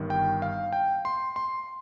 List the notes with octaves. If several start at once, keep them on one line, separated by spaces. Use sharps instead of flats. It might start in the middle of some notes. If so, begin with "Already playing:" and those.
Already playing: G1 G2 D#3
G5
F5
G5
C6
C6